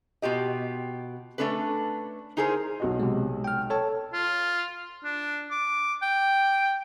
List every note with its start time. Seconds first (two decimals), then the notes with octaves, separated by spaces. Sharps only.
0.22 B2 F4 G4 D#5
1.38 A3 C#4 D4 A4 B4
2.37 D#4 E4 G#4 A#4 C5
2.80 B1 F#4 D#5
3.00 C3 G#3
3.44 G5 F6
3.70 A4 C#5 A5
4.13 F4
5.04 D4
5.51 D6
6.02 G5